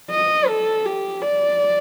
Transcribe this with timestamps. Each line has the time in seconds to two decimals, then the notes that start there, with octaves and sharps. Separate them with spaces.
0.11 D#5
0.48 A4
0.85 G4
1.22 D5